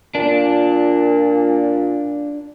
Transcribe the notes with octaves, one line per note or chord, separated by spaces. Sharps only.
A#2 D4